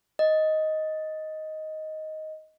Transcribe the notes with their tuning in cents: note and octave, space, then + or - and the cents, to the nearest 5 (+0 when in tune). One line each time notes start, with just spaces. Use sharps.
D#5 +10